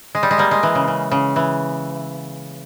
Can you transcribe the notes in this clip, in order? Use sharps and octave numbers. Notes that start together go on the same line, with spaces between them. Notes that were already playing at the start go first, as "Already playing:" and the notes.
G#3
G3
G#3
G3 A#3
G#3
E3
C#3
C#3
C#3
E3